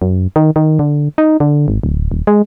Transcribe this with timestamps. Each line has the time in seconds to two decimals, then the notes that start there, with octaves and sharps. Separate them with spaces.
0.02 F#2
0.36 D#3
0.56 D#3
0.79 D3
1.18 D#4
1.40 D3
1.68 G#1
1.83 D1
2.12 D#1
2.27 G#3